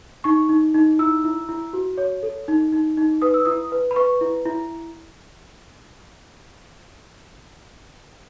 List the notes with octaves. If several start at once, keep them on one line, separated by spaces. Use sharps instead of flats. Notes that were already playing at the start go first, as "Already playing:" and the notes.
D#4 C#6
D#4
D#4
E4 E6
E4
E4
F#4
C#5
A4
D#4
D#4
D#4
B4 D#6
E6
E4 D#6
B4
B5
B4 C#6
E4
E4